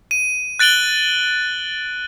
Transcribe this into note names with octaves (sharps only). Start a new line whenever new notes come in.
D#7
F#6 A6 D7 F#7 G7